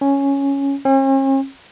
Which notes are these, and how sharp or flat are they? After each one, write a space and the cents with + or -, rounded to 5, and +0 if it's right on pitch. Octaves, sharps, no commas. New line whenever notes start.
C#4 +0
C#4 -45